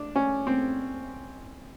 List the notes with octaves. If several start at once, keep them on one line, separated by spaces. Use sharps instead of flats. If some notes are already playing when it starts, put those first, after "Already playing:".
Already playing: D4
C#4
C4